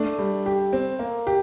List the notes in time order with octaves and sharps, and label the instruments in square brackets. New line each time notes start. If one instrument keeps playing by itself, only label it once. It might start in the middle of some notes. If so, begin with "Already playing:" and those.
Already playing: [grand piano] A3 A4 [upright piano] D4
[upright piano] G3
G4
C4
A#3
G4